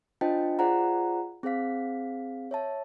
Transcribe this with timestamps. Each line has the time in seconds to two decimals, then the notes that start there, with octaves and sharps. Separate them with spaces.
0.21 D4 F4 C5 D#5 G5 A5
0.59 F4 G#4 C5 D5 F#5 A#5
1.43 C4 G#4 C5 F5 B6
2.51 C#5 E5 A5